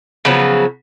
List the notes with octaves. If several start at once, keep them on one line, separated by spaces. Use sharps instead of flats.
C#3 F3 F#3 B3